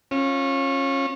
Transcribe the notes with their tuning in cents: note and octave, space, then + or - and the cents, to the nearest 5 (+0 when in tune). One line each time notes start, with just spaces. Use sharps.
C#4 -25 F4 +10